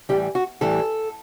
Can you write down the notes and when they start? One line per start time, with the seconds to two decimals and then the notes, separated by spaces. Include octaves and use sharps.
0.09 A2 E3 G3 G4
0.35 F#4
0.61 A2 E3 G3 A4